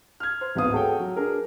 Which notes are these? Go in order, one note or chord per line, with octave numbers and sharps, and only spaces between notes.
F6 G#6
C5
D1 G#1 B3 F5 D#6
F#4 G#4 A4 C#5 G5
F#3
D4 G#4 A#4 B4